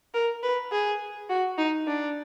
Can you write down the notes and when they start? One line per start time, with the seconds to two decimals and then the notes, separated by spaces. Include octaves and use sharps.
0.14 A#4
0.43 B4
0.72 G#4
1.29 F#4
1.58 D#4
1.87 D4